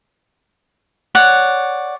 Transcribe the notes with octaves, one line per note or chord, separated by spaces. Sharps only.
C#5 D5 F#5